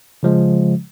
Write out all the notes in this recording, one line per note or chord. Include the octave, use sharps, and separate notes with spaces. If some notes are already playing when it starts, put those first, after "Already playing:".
C#3 F3 G#3